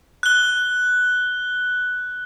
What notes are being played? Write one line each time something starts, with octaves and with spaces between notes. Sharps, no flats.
F#6 G7